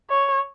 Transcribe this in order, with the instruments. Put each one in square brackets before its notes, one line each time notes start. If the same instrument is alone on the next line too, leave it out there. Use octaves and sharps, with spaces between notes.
[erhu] C#5